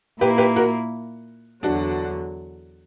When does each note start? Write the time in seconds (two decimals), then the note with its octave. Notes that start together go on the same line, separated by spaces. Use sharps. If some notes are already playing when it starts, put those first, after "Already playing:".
0.20 A#2 A#3 E4 G4 B4
0.38 G4 B4
0.56 F#4 A#4
1.63 E2 D3 F#3 D4 F#4